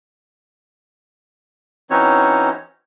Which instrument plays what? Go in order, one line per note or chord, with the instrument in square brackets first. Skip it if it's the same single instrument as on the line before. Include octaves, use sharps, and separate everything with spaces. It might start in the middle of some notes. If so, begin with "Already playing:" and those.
[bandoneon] E3 C4 C#4 D#4 F#4 C#5